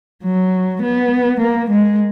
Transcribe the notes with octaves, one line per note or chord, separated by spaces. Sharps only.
F#3
B3
A#3
G#3